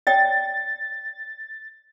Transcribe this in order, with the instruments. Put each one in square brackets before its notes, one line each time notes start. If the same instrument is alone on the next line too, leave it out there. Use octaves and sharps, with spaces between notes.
[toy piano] C#5 D5 G5 [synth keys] A6